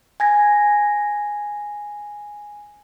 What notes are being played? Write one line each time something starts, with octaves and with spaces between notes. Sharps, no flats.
G#5 G#6 A#6